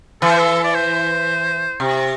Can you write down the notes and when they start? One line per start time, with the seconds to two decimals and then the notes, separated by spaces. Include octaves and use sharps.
0.22 E3 A4
0.31 C5
0.39 A4
0.64 D5
0.75 C5
1.80 C3